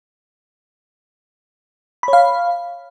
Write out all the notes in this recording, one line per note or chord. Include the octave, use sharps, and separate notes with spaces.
C#5 F5 B5